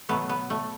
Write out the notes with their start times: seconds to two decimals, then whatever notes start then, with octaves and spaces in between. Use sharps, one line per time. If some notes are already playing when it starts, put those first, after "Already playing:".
0.09 B2 F#3 A3 B3
0.29 B3
0.50 A3